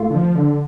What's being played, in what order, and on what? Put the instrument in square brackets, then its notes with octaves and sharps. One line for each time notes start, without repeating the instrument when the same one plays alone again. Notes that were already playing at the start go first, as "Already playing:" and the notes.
Already playing: [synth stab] A2 A3 F4
[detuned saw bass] D3
F3
D3